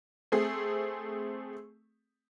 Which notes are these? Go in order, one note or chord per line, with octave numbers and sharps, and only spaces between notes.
A3 C4 G#4